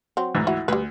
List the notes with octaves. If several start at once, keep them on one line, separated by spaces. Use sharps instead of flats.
F#3 C4
D2 G#2 E3
E4 F#4 B5
D2 G3 B4